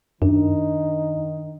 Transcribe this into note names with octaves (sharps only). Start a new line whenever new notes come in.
F#2 D#3 D4 D#4